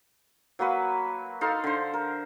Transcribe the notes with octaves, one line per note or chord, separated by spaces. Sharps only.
F#3 A#3 F#4 B4
D#4 A4 F5 C6
D3 C5
A#4